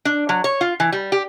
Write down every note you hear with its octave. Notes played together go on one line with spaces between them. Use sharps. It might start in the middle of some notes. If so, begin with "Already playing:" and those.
D4
F#3
C#5
F4
E3
G3
G4